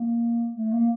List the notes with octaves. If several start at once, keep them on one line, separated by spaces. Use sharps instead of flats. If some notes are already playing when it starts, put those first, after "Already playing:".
Already playing: A#3
A3
A#3